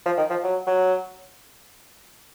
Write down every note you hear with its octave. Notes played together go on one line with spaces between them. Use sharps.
F3
D#3
F3
F#3
F#3